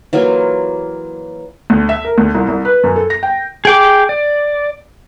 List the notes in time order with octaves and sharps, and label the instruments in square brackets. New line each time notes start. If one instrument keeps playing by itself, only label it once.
[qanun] E3 F#3 A#3 F4
[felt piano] D2
E5
A#4
D2
C2
C2
B4
F#2
A4
A#6
G5
[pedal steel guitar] G#4 G5 D6
D5